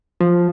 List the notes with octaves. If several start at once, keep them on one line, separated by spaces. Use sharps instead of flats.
F3